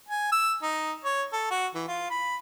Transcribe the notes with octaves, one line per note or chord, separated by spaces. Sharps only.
G#5
E6
D#4
C#5
A4
F#4
E3
F4
B5